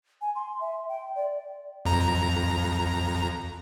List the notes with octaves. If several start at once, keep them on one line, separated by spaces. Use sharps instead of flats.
G#5
C6
E5
G5
D5
F2 A#5